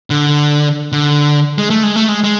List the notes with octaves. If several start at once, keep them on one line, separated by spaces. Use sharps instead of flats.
D3
D3
G#3
A3
G#3
A3
G#3
G#3